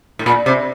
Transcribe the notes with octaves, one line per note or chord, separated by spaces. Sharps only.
A2
A#2
C3